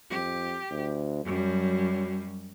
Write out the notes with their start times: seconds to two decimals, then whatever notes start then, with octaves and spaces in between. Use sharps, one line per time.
0.11 F2 G4
0.70 D2
1.25 F#2 F#3 G3